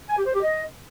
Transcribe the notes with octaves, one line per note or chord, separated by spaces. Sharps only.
G#5
G4
C5
G4
D#5